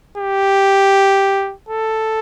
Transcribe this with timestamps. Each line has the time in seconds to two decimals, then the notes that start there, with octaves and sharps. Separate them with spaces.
0.18 G4
1.69 A4